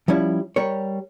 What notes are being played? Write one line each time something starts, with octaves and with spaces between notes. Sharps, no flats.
F3 G3 C#4 E4
G3 A#4 C#5